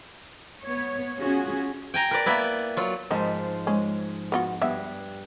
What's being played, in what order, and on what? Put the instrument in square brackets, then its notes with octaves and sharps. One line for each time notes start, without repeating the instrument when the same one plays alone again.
[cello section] B3 C#5
C#4 F4 F#4 G#4
[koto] G5 G#5 A#5
A#4 B4 D5
A#3 B3 E4 B4
F#3 F4
[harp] G#2 F3 [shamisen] D#3 D#4
[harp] G#3 [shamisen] C#4
[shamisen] B3 F4 F#4
[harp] G2 [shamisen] B3 E5